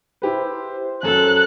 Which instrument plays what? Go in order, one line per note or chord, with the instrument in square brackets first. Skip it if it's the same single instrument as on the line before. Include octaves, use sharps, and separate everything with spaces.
[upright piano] E4 G4 B4 [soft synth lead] C5
[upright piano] F#2 F#3 [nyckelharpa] A4 [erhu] F#6